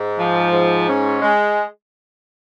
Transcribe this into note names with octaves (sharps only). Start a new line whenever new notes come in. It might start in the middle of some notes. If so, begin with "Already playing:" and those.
Already playing: G#2
F3
G#2
C#4
G#3